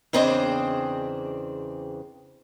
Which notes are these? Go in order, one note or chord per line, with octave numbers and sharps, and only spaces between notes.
E2 C#3 C4 D4 D#5